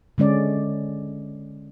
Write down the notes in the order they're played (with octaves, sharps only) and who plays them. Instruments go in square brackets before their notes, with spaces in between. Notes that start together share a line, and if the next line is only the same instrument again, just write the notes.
[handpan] D3 G#3 C#4 D5